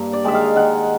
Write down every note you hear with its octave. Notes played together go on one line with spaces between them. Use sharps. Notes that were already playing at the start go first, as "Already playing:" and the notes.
Already playing: G2 A#3
D5
D#3 G#3 E5
F5
D#3 F#5